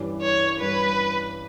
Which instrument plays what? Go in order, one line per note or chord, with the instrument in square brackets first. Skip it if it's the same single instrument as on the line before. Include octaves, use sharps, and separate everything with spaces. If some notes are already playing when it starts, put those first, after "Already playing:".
Already playing: [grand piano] G2 E3 G3 C#4
[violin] C#5
[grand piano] G2 E3 G3 C#4 [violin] B4